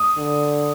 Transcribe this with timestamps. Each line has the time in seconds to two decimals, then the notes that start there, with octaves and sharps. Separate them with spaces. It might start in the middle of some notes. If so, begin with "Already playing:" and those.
Already playing: D#6
0.17 D3